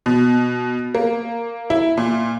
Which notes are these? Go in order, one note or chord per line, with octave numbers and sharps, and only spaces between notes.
B2
A#3
E4
A#2